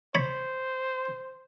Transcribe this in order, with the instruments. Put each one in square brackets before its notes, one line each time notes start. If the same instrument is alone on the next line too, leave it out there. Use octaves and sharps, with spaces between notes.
[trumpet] C5 [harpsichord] C#5 B5